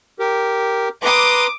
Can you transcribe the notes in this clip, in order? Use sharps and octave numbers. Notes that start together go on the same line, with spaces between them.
G4 A#4
B4 A#5 C6 D6 D#6